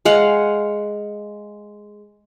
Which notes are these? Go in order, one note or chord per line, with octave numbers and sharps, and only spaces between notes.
G#3 F5 F#5